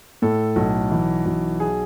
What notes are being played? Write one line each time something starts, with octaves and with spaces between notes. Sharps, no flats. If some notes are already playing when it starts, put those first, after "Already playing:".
A2 A4
B1
E3
B1
G#4